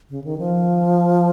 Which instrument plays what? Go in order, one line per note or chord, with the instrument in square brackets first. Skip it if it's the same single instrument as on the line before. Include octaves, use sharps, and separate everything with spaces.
[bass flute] C#3
D#3
F3